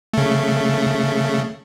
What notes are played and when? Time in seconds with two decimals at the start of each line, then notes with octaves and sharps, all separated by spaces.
0.13 C#3 A3